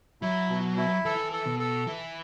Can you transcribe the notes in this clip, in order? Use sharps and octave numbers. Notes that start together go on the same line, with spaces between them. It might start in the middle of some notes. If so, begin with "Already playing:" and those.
F#3 E4
B2
E4
E3 A4
A4
B2
A4
E3 E4